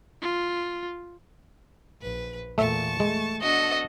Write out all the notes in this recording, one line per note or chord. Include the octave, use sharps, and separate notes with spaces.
F4
A#1 B4
E2 A#2 A3 E5 A5 C#6
G#3 A3
B3 D4 F#4 A4 D#5